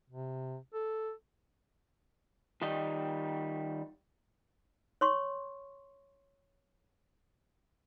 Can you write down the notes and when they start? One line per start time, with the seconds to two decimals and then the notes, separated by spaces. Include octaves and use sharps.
0.10 C3
0.74 A4
2.62 D#3 G3 D#5
5.01 C#5 C6 C#6